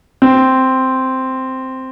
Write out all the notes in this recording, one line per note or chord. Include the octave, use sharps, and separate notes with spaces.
C4